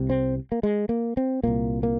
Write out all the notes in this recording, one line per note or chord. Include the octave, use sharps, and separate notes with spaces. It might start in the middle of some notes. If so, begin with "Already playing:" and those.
Already playing: C2 C3
C4
A#3
G#3
A#3
C4
C2 A#2 A#3
A#3